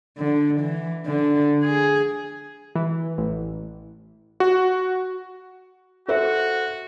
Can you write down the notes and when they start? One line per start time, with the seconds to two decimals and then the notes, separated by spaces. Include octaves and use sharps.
0.18 D3
0.60 E3
1.06 D3
1.64 G#4
2.75 E3
3.18 A1
4.40 F#4
6.08 F#4 A4 C5 E5